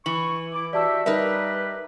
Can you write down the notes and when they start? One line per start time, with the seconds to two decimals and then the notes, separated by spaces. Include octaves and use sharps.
0.06 E3 C#6 F#7
0.53 E4 D6
0.73 F#4 G4 D5 E5 A5 E6
1.06 G3 D#4 G4 A#4 B4 E5